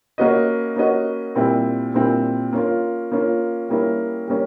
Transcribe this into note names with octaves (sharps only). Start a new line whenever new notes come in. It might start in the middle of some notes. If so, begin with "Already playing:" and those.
A#3 C#4 F#4 B4 D#5
A#3 C#4 F#4 B4 D#5
A#2 G3 C4 E4
A#2 G3 C4 E4
A#3 C#4 F4
A#3 C#4 F4
G3 A#3 C#4 E4
G3 A#3 C#4